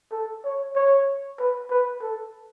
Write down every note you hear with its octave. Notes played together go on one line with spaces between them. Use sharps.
A4
C#5
C#5
B4
B4
A4